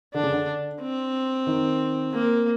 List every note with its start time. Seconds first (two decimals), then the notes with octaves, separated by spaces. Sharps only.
0.14 D3 D4
0.23 C#3
0.32 D3
0.81 C4
1.47 D#3
2.13 A#3